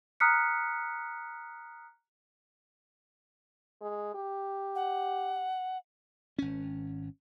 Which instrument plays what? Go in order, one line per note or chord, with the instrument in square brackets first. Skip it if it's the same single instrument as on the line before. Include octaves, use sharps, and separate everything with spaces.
[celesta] A#5 D#6 F6 F#6 B6 C#7
[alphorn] G#3
G4
[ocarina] F#5
[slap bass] G#1 C#4